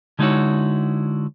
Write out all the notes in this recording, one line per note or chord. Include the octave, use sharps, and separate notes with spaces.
D3 G#3 D#4 E4 F#4 C#5